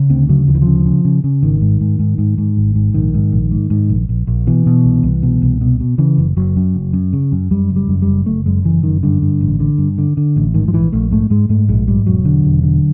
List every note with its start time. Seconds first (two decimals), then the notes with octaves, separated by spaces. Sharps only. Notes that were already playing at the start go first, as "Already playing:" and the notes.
Already playing: C#3
0.10 D2 C4
0.29 C#3 F#3
0.48 D2 F3
0.55 E3
0.62 C#3 F3
0.86 C#3
1.05 C#3
1.24 C#3
1.43 G#1 D#3
1.62 G#2
1.81 G#2
1.99 G#2
2.18 G#2
2.38 G#2
2.57 G#1
2.75 G#2
2.94 A#1 D#3
3.14 G#2
3.32 A#1
3.51 G#2
3.70 G#2
3.89 A#1
4.09 A#1
4.27 A#1
4.47 B2 E3
4.66 B2
4.84 C2
5.03 C2
5.23 B2
5.42 C2
5.61 B2
5.80 B2
5.98 C#3 E3
6.18 F#1
6.37 F#1 F#3
6.56 F#2
6.74 F#1
6.93 F#2
7.13 C#3
7.32 F#2
7.51 F#2 G3
7.70 F#1
7.76 G3
7.89 F#2
8.02 G3
8.07 F#1
8.26 F#1 A3
8.46 F#2 G#3
8.65 F#1 E3
8.83 F#2 D#3
9.03 G2 D3
9.22 G2
9.41 A1
9.60 D3
9.78 G2
9.98 D3
10.17 D3
10.36 A1
10.54 G#2 D#3
10.68 F3
10.74 A#1 E3
10.93 A#1 A3
11.11 G#2 A3
11.30 G#2 G#3
11.49 G#2 A3
11.69 A#1 G#3
11.88 G#2 G3
12.07 E1 F#3
12.25 D3
12.45 E1
12.63 D3